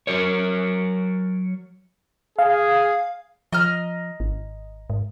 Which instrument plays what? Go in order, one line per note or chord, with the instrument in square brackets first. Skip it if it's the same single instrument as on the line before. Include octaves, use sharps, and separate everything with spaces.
[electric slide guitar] F#3 A#4 C#5
[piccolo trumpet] G#4 [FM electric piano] F5
[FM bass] F3 [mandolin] D#5 A#5 F6
[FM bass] G#1
G#2